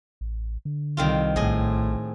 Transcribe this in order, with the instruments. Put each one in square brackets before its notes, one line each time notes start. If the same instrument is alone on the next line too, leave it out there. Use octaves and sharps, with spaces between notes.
[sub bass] A1
D3
[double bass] C2 [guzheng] D#3 C4 F4
[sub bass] A#1 [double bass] A2 [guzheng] G#4 D#5